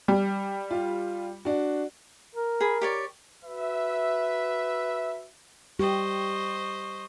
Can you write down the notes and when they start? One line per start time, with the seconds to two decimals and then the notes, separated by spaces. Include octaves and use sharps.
0.08 G3
0.71 F4
1.45 D4 F#4
2.35 A#4
2.61 G#4 B5
2.81 G4 C#5 D5
3.45 F#4 B4 E5
5.79 G3 G4 C5 D#5 C#6